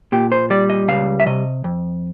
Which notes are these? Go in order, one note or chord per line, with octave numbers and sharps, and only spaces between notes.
A#2 G4
C5
G3 D5
D#5
C#2 F5
E5
C3 D#5
F2